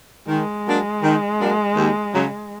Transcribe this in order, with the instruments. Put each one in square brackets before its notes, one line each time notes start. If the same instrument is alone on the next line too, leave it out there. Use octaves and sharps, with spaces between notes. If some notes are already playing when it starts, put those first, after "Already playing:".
[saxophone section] D#3 [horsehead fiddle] G#3
[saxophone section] F#3 A#3 D4
D#3
F#3 A#3 D4
D#2
C#3 F#3